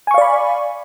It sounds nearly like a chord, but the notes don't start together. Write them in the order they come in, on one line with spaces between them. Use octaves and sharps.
G#5 C#6 F5 D5 B5